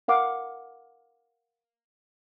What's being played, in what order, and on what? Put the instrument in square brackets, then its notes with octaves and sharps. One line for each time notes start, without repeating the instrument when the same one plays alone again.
[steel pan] A#4 F5 F#5 D6